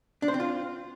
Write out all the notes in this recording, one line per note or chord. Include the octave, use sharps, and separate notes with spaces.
D4
C5
C4
F4